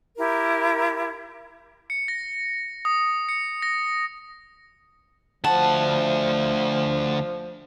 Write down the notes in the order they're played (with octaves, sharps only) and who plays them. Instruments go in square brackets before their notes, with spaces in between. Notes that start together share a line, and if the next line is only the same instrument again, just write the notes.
[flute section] E4 G4 A#4
[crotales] C#7
A#6
D#6
C#7
A#6
[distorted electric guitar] D2 F#5 [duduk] F3 [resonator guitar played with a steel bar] A5